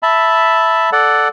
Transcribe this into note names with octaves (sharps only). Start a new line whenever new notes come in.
E5 A5 B5
A4 D5 F#5